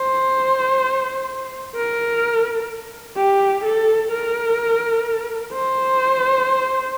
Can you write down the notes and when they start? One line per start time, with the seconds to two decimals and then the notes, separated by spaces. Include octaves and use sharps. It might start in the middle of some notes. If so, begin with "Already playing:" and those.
Already playing: C5
1.75 A#4
3.17 G4
3.64 A4
4.11 A#4
5.53 C5